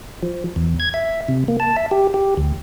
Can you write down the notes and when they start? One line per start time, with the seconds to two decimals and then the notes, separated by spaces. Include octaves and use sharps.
0.22 F3
0.56 E2
0.80 G#6
0.94 E5
1.28 C3
1.48 A#3
1.60 A5
1.76 E5
1.91 G4
2.14 G4
2.37 D2